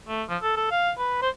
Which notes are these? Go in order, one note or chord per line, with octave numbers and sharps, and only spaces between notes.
A3
F3
A4
A4
F5
B4
C5